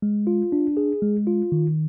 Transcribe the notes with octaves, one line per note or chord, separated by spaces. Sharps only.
G#3
F4
D4
G#4
G#3
F4
D#3